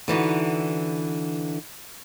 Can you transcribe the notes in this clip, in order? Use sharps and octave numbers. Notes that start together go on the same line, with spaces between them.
D3 E3 D#4 F#4